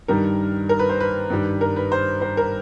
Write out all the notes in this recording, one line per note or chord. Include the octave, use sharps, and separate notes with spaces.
G2 D#3 G3 A#4
A#4
B4
C5
B4
G2 D#3 G3
A#4
B4
C5
C5
A#4